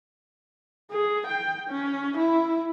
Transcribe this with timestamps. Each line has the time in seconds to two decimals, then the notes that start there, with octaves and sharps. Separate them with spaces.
0.91 G#4
1.27 G5
1.70 C#4
2.17 E4